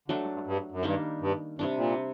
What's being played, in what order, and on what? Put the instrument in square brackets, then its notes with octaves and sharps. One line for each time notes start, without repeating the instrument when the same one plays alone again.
[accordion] D3 [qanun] F#3 A3 D4
[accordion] G2
G2
G2
F#2
[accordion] G2 [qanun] D#3 G3 A#3 D4
[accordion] G2
[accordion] G2 [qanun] C3 G3 D4
[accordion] A#2